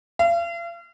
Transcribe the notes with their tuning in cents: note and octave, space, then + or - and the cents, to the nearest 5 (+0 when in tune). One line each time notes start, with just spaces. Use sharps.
F5 -40